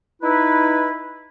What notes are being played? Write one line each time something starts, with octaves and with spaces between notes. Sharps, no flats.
D#4 E4 B4